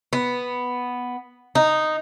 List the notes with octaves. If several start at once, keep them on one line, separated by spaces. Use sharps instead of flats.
B3
D#4